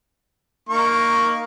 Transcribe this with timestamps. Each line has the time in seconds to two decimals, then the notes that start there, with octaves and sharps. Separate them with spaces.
0.69 A#3 D#4 C#6